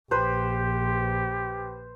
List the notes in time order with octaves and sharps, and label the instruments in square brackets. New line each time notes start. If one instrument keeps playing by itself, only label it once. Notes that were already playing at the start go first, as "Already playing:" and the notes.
[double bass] A#1 [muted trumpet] G4 [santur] B4 C5